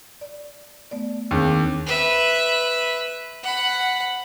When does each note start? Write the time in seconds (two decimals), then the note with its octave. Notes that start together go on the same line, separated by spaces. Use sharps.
0.21 D5
0.91 A3 B3 D5
1.31 D#2 C4 D4 G#4
1.86 B4 E5
3.43 F#5 B5